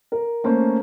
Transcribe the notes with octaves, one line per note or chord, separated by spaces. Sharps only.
A#4
A3 A#3 C#4 C5